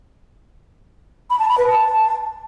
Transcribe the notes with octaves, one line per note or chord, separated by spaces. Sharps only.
B5
A5
B5
B4
A5